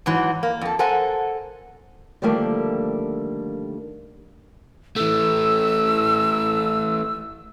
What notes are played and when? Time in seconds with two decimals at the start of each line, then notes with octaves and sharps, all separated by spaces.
0.06 G#2 E3 F#3
0.43 A#3
0.61 F2 A4
0.79 A4 A#4 C5 F#5 G#5
2.22 D3 D#3 F3 G3 A3 A#3
4.96 E3 A3 E6